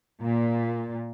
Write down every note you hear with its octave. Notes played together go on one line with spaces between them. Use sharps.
A#2